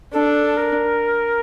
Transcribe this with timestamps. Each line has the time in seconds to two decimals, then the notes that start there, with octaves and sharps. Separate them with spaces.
0.13 D4 A4
0.57 A#4